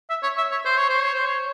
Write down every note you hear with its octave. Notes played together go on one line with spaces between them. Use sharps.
E5
C#5
E5
C#5
C5
C#5
C5
C#5
C5
C#5